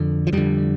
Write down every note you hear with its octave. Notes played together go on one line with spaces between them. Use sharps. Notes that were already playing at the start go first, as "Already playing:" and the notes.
Already playing: F2 D3
F3
F2 D3 G3